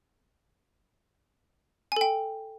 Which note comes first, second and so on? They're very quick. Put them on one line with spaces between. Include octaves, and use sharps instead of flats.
G#5 A4 G5